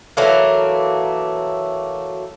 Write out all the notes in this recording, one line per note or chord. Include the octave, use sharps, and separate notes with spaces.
E3 F#3 A3 A#3